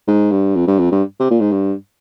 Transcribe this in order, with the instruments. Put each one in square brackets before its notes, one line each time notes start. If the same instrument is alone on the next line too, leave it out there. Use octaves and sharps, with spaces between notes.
[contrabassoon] G#2
G2
F2
G2
F2
G2
C3
A#2
G#2
G2